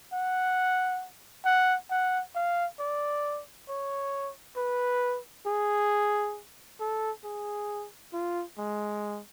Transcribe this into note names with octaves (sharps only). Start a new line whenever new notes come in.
F#5
F#5
F#5
F5
D5
C#5
B4
G#4
A4
G#4
F4
G#3